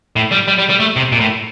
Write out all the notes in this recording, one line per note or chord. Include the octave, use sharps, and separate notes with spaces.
A2
G3
G3
G3
G3
A3
C3
A#2
A2